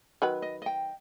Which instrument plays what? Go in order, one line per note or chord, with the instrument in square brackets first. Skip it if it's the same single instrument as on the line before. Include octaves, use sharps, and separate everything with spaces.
[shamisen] D#3 F#3 B4
[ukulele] D#5
D#5 G5